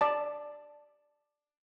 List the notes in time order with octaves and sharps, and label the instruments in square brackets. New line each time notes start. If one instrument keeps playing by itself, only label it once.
[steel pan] D5 A5